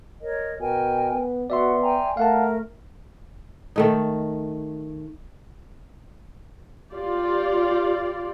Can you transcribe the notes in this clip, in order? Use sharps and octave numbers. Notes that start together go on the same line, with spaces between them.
A#4 C#5 D#5
B2 A#4 G5 G#5
B3
B3 F#4 D5 E5 C6
G5 G#5 A#5
A3 A#4 F5 F#5 A5
D#3 A3 D#4
F4 G4 D5